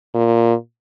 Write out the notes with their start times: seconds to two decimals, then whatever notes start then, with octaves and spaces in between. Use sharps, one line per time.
0.15 A#2